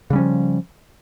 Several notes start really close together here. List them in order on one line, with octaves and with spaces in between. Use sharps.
C#3 G3 C#4 F3